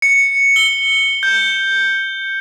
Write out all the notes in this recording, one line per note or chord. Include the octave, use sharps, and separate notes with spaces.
C#7
G7
G6